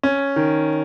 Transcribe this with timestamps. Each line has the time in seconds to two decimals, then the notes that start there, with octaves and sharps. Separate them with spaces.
0.03 C#4
0.36 D#3